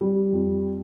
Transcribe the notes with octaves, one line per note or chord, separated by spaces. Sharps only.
G3
F2